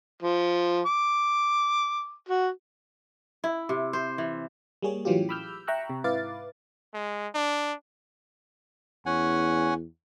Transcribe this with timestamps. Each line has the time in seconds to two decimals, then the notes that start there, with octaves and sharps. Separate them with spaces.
0.22 F3
0.86 D6
2.28 F#4
3.44 E4
3.69 C3
3.93 C5
4.18 E3
4.82 G3 A#3 G#4 C#5
5.05 A2 E3 F#3 C#4 F4 G4
5.29 B5 D6 E6 F6 G6
5.67 E5 G5 A#5 C#6 E6 F#6
5.90 C3
6.04 G#2 E4 B4 F5 D6 A6
6.94 G#3
7.34 D4
9.06 E2 C#4 F#5 G#5